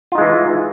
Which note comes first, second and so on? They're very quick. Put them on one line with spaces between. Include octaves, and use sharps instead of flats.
F4 D#4 G#3 E3